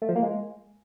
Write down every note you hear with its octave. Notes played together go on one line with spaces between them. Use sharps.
A3
F3
A#3
G#3